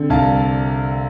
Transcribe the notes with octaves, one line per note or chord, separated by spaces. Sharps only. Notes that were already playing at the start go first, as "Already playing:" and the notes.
Already playing: D3 C4
C2 F5 A5